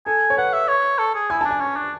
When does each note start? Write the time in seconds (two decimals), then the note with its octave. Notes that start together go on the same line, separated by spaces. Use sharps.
0.06 A4 G#5
0.30 C#5
0.37 B4 F#5
0.53 E5
0.68 C#5
0.99 A4
1.15 G#4
1.30 E4 G#5
1.41 D4 A5
1.51 G#5
1.61 C#4
1.76 D4